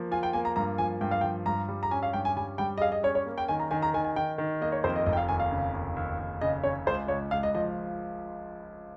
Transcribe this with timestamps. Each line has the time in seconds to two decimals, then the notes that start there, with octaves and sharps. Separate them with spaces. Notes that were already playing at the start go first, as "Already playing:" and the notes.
Already playing: F3 A#3
0.11 F4 G#5
0.23 G5
0.33 A#3 G#5
0.45 A#5
0.56 G2 A#5
0.78 F3 G#5
1.01 G2 G5
1.11 F5
1.21 F3 G5
1.46 G2 A#5
1.68 G3
1.83 A#5
1.91 C#4 G#5
2.03 F5
2.13 G2 G5
2.25 G#5
2.37 G3 G#5
2.58 G3 G5
2.78 D#5
2.81 G#4 F5
2.92 D#5
3.03 C#4 C#5
3.15 C#5
3.26 A#3
3.38 G5
3.48 D#3 G#5
3.60 A#5
3.71 D#3 G#5
3.82 A#5
3.94 D#3 G#5
4.04 G#5
4.16 D#3 G5
4.38 D#3
4.61 A#3 D#5
4.72 C#5
4.84 F2 C5
4.96 D#5
5.06 F1 D#5
5.13 G5
5.17 F5
5.29 D#2 G#5
5.39 F5
5.51 C#3
5.74 D#2
5.96 D#2
6.19 D#2
6.41 C#3 D#5
6.63 C#3 C#5
6.86 C#2 C5
7.08 C#2 C#5
7.31 C#2 F5
7.43 D#5
7.55 F3 D#5